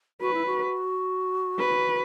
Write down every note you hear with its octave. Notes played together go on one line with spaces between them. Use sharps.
F#4 B4
E4
F#4
B4